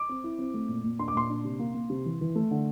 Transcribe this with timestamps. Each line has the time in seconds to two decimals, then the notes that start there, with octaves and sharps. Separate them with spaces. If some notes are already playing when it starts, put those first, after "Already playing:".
Already playing: D6
0.09 C4
0.24 E4
0.39 C4
0.54 A3
0.69 A#2
0.84 A#2
0.99 D4 C6
1.08 D6
1.15 A#2 C6
1.30 D4
1.45 C3
1.59 A#3
1.74 A#3
1.90 C3
2.05 E3
2.21 E3
2.35 A3
2.51 D3